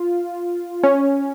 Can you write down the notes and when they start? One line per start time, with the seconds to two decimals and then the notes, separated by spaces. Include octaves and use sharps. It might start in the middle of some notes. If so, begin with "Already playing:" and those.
Already playing: F4
0.84 C#4